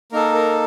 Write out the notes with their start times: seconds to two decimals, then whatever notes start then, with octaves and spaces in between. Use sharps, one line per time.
0.12 A#3 D#4 A4 A#4
0.35 A#4